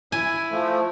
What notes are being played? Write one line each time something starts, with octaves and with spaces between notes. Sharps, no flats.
E4 G#5
F3 A3